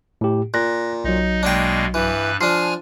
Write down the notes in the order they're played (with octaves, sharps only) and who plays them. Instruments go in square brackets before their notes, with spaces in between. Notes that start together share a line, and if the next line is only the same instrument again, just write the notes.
[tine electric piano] A2 G4
[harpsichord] A#2 [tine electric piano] F#6 A#6
[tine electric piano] B1 F#3 [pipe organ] D#4 D#5
[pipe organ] B2 G#3 A#3 [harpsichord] D4 G5
[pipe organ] G2 B4 F#6 [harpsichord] E3
[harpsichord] F3 D4 [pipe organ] G#5 F6 [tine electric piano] C7